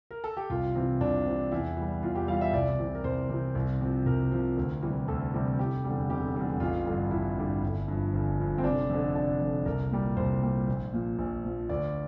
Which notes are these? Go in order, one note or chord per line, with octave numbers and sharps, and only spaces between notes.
A#4
A4
G4
C2 F4
C3 E3
C2 D4
C3 E3
E2 E4
E3 G3
E2 F4
G4
E3 G3 F5
E5
C2 D5
C3 E3
A#4
C2 C5
C3 E3
C2
C3 F3
C2 A#4
C3 F3
D2
C3 E3 G3
D2 A4
C3 E3 G3
F1 G4
E2 D3 G3
F1 G4
E2 D3 G3
A1 F4
G2 D3 G3
A1 E4
G2 D3 G3
G1
G2 F3
G1
G2 F3
C4
F1 D4
F2 D3
F1 D4
F2 D3
C2 A#4
A#2 G3
C2 C5
A#2 G3
A#1
A#2 F3
A#1
A#2 F3
D2 D5